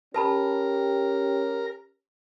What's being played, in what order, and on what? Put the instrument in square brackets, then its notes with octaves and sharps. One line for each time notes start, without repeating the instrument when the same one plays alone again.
[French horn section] C#4 G4 [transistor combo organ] A#4 [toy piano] B4 A5 B5